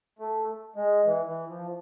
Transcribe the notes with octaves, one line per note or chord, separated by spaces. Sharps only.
A3
G#3
E3
E3
F3